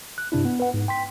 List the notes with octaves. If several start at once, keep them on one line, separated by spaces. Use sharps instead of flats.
F#6
G2 C3 D4 E4
B3
B4 F#5
G#2
G5 C6 B6